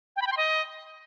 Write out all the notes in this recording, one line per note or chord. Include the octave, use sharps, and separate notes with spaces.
G5
B5
G5
C6
D#5